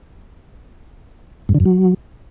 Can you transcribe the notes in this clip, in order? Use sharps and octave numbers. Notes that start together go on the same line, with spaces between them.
G2
D3
F#2
F#3